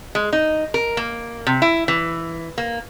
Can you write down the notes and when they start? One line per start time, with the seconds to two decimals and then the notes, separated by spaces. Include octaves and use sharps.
0.15 G#3
0.33 D#4
0.74 A#4
0.97 A#3
1.47 C3
1.62 E4
1.88 E3
2.58 A#3